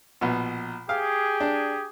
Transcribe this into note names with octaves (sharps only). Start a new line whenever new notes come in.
A#1 B2
G4 G#4 F5
D4